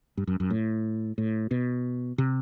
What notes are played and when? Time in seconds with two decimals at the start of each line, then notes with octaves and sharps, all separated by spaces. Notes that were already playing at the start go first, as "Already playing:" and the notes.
0.17 G2
0.27 F#2
0.40 F#2
0.50 A2
1.18 A2
1.51 B2
2.18 C3